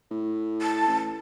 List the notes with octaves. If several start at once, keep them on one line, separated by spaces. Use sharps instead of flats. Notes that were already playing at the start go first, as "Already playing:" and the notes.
A2
A5
A1